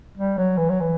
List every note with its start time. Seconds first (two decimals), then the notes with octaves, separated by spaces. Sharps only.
0.17 G3
0.38 F#3
0.57 E3
0.69 F#3
0.80 E3